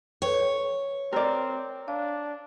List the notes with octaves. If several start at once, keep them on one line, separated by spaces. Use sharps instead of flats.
A4 B4 C#5 G5
C4 A#4 D5
D4 F5